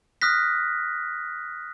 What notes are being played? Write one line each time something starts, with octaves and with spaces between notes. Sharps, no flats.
D#6 F6 F#6 A#6 B6